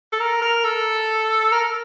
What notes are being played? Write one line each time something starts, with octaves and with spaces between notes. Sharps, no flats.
A4
A#4
A#4
A4
A#4